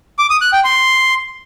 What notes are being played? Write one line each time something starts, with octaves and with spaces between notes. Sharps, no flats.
D6
D#6
F#6
G5
C6